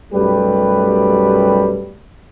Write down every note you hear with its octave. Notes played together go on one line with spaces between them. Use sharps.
B1 F#2 G3 A3 G4 B4